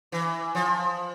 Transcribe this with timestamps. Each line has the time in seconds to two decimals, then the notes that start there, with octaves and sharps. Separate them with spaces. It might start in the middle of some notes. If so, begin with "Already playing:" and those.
0.12 E3
0.55 F3